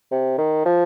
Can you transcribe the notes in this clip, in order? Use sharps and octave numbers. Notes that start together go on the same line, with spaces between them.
C3
D#3
F3